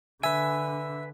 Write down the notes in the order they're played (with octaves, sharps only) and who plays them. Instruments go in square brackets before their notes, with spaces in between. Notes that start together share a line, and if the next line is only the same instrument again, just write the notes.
[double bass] D3 [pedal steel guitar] B4 G#5 [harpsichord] E5